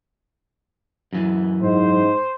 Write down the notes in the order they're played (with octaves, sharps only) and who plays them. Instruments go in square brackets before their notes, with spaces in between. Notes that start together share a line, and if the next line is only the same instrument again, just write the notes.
[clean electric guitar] F#2 E3
[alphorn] G#2 [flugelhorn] C5